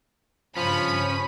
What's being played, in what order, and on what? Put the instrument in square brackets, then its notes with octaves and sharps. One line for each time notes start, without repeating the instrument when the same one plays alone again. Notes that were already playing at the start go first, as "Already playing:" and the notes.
[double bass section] G2 C#3 [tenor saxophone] F3 [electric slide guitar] C#4 [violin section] B5